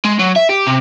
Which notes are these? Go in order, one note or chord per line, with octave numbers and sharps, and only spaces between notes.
G#3
F#3
E5
G4
C3